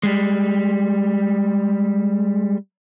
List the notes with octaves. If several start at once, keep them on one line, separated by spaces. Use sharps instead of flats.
G3 G#3